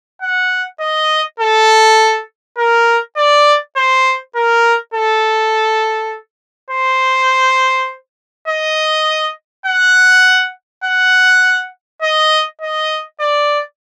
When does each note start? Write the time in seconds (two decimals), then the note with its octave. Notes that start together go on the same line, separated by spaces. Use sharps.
0.22 F#5
0.81 D#5
1.40 A4
2.58 A#4
3.16 D5
3.76 C5
4.35 A#4
4.94 A4
6.70 C5
8.48 D#5
9.66 F#5
10.84 F#5
12.02 D#5
12.61 D#5
13.20 D5